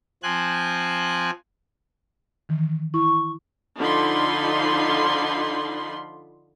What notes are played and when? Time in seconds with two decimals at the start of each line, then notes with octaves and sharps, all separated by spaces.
0.23 F3 C4 G#5 F#6
2.49 D#3 E3
2.94 E4 C#6
3.79 D3 F3 D#4 F4 B5 C6